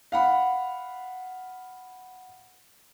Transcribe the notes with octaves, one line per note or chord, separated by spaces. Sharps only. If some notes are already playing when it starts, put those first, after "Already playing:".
F5 F#5 B5